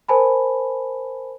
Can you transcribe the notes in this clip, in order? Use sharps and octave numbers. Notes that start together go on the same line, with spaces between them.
A#4 C5 G#5 A5 B5